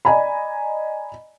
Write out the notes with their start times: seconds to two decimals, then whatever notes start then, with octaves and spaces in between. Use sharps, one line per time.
0.05 D5 D#5 G#5 A#5 B5